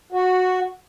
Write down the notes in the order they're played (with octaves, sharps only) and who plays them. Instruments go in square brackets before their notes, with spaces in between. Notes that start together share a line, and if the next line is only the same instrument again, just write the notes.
[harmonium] F#4